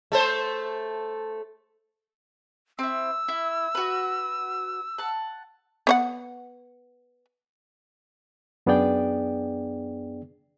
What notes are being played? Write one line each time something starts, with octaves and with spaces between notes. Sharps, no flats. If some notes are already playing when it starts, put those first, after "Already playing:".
A3 A4 C5
C4 E4 E6
E4
F#4 B4
F#5 A5
B3 C#5 F#5
F#2 B3 D4 G#4 D5 G5